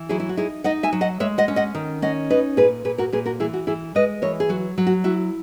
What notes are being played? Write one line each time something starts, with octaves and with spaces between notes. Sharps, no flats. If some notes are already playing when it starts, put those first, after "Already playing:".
Already playing: E3
F#3 E4 G#4
E4
F#4
D#4 E4 G#4
D#4 D#5 F#5
E5 G#5
F#3
D#5 F#5
G#3 C#5 E5
D#5 F#5
C#4
D#5 F#5
D#3
C#4 D#5 F#5
D#4 B4 D#5
A#2 G#4 B4
A#2 G#4 B4
F#4 A#4
A#2 G#4 B4
F#4 A#4
E3 E4 G#4
F#4
E3 E4 G#4
G#3 B4 D#5
E3 A#4 C#5
G#4
F#3 F#4
F#3
F#4
E4 F#4